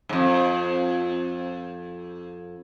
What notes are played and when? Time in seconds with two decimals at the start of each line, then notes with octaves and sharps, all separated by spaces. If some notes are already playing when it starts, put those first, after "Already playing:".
0.09 F2 G#2